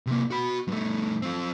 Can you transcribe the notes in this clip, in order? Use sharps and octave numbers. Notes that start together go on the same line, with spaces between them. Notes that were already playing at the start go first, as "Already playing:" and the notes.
C3 A#3
F#4 B5
G2 A3
C4 F4